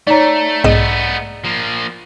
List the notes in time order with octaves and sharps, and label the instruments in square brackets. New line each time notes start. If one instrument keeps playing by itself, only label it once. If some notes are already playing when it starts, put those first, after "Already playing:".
[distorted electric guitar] A3 [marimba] D#4 C#5 [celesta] D5 A#5
[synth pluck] B1 G#2 D#5 [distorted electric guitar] A3 B3
[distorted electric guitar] F3 A#3